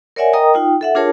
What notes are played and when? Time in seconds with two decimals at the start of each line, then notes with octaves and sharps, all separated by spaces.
0.16 A#4 C#5 D5 E5 F#5 G#5
0.33 A#4 D#5 G5 A#5 D#6
0.54 D#4 F4 G5
0.81 A4 E5 F#5
0.95 D4 F4 G#4 A#4 C#5 A5